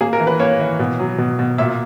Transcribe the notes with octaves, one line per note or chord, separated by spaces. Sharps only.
A#3 G#4
A#4
E3
B4
A#3 C#5
E3
B2
F#3
B2
B2
A#2 E5